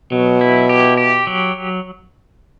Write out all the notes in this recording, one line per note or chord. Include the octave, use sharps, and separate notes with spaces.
B2 F#3
E4
G4
G4
F#3